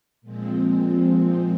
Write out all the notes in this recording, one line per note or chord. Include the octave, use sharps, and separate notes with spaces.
A#2 F3 G#3 C4